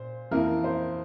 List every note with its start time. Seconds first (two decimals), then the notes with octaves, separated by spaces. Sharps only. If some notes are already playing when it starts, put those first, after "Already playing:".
Already playing: A#2 C5
0.31 F2 E3 A#3 A#4
0.64 C5